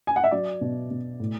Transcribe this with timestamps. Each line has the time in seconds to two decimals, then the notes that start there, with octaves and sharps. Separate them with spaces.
0.07 G#5
0.16 F#5
0.24 E5
0.31 F#3 D5
0.61 B2
0.91 B2
1.20 A2